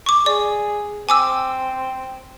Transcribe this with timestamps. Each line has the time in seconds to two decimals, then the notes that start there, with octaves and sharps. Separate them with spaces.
0.06 C#6 D6
0.26 G#4 D5
1.09 C4 G#5 D6 E6